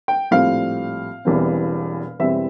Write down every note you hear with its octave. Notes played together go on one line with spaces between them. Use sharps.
G5
A#1 A2 G3 C4 F5
E1 E2 E3 G3 C4
E1 E2 E3 G3 C4 E5